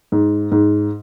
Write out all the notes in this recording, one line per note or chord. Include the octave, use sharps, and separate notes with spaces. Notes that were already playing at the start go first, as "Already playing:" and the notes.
G#2
G#2